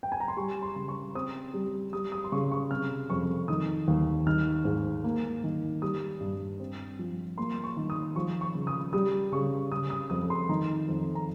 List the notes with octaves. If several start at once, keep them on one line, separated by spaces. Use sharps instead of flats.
G5
G#5
A#5
C6
G3 C#6
C6
C#3
C#6
C4 D#6
G3
G3 D#6
D#6
C6
C#3 C#6
C#6
C3 F6
F2 C#6
D#3 D#6
D#2
D#3 F6
G#2
A#3
D#3
G3 D#6
G2
C4
F3
A#3 C6
C#6
D#3
D#6
F3 C#6
C#6
C#3
D#6
G3 D#6
C#3 C#6
C#3 D#6
D#6
F2 D#6
C6
D#3 A#5
F2
A#5